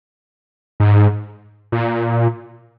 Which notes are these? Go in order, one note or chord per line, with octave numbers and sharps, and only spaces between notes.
G#2
A#2